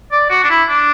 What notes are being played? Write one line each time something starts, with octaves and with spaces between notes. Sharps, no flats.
D5
F#4
D4
E4
D4